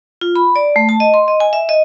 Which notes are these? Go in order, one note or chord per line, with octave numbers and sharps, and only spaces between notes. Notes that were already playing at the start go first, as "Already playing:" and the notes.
F4
B5
D5
A3
A5
D#5
C6
D#5
G#5
E5
D#5